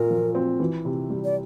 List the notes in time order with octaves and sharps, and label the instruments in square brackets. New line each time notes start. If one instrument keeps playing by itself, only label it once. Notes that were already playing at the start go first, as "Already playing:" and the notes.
Already playing: [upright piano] A#2 A3 [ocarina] A#4
[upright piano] F3
C4
E3
C3
G3
[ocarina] D5